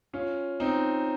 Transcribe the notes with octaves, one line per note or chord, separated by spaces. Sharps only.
C#4 F4
C4 D#4